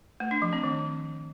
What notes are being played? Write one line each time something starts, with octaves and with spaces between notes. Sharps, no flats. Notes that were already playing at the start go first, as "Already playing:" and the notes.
A3
D4
F3
C4
D#3